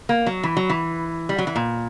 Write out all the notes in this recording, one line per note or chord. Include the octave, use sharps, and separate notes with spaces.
A#3
F#3
E3
F#3
E3
G3
F#3
E3
A#2